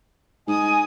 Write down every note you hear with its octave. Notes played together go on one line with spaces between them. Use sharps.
G#2 D#5 G#5 D#6